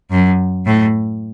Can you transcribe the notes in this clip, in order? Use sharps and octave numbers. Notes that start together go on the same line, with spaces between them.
F#2
A2